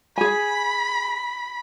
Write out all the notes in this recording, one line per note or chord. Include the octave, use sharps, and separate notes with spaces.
G#4 G#5 B5